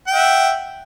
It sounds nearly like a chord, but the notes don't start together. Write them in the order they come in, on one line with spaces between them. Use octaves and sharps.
G5 F#5 E5